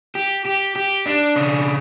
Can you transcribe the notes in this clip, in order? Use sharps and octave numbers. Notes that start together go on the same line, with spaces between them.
G4
G4
G4
D4
C#3